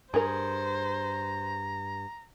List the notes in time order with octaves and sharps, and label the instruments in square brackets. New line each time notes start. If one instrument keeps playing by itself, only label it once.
[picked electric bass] G2 [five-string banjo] G#4 A#4 [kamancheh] C5 [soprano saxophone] A#5